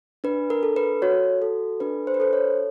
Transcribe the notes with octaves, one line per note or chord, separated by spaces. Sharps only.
D4 B4
A#4
A4
B4
F#4 C#5
A4
D4 B4
C5
B4
A4 C5
C#5